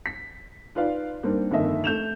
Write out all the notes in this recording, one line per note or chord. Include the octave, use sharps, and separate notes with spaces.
B6
D#4 F4 B4 D5 F5
G3 A#3 C4 D4 D#4
G1 F2 D#3 A#3 D#5 E5
A3 G6 E7 F7